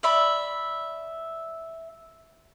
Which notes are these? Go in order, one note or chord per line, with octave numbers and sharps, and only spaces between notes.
D5 E5 B5